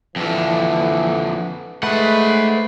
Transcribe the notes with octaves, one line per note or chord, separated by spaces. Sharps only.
F2 D3 E3
G#3 A3 B4 C5 F#5